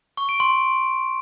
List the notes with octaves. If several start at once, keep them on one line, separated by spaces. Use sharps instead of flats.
C#6
D7
C6